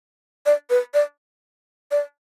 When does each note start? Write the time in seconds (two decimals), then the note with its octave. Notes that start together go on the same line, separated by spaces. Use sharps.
0.46 D5
0.70 B4
0.94 D5
1.91 D5